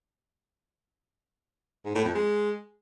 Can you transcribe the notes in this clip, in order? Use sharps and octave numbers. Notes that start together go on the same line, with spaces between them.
G#2
A2
F2
G#3